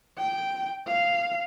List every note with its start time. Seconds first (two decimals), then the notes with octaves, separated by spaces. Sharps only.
0.18 G5
0.88 F5